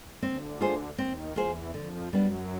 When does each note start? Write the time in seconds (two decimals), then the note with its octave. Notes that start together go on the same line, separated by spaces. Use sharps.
0.22 D2 D3 C4
0.61 F4 G#4 C5
0.98 D#2 D#3 C4
1.36 E2 E3 F4 G#4 C5
1.74 F2 D3 F3
2.12 F#2 F#3 G3 B3 D4